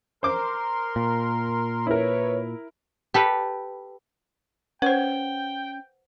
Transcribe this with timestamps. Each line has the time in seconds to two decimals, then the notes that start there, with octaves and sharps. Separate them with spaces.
0.23 A#4 C5 C6 D6
0.96 A#2
1.87 E4 A#4 B4 C#5
3.14 G4 A4 B4
4.82 C#4 B4 C5 F#5 G5